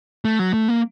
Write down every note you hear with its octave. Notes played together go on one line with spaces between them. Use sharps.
A3
F#3
A3
A#3